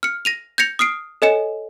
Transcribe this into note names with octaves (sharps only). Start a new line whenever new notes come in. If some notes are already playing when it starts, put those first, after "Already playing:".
F6 C#7
A#6 D#7 F7
G6 G#6 A#6 C#7 F7
D#6 F6 C7 D7
A4 C#5 D#5 G#5 C#7 E7